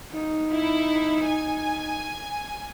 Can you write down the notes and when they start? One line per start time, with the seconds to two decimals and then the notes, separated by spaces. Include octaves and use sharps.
0.13 D#4
0.51 E4
1.25 G#5